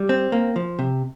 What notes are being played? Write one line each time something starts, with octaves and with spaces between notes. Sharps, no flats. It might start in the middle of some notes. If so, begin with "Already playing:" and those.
Already playing: G3
C4
A#3
F3
C3